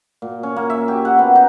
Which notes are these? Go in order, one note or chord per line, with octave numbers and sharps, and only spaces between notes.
A#2
C#4
A#3
E5
G4
F#5
B3
D#4